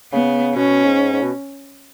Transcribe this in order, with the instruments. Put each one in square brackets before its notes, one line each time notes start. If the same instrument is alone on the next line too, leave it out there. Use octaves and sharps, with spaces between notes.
[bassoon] C#3 [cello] B3
[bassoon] B2 [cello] C#4
[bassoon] G#2
G#2
B2